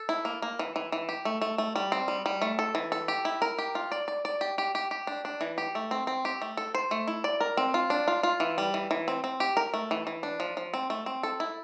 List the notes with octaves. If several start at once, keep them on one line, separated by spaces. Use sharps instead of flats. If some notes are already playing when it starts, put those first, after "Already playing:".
Already playing: A4
E4
A#3
A#3
E3
E3
E3
G4
A3
A3
A3
G3
C4
G3
G3
A3
A4
E3
A4
G4
E4
A#4
G4
F4
D5
D5
D5
G4
G4
G4
G4
D4
D4
E3
G4
A3
C4
C4
G4
A3
A4
C5
A3
E4
D5
A#4
C4
F4
D4
F4
F4
E3
G3
E3
E3
C4
C4
G4
A#4
A3
E3
E3
D4
F3
F3
C4
A3
C4
A4
E4